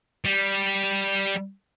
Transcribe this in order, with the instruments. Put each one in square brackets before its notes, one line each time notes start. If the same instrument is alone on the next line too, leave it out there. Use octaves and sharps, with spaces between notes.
[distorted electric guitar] G3